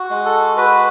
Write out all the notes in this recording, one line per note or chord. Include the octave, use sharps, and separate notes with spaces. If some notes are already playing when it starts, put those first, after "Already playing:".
Already playing: F#4
G#3
A4
F#4 B4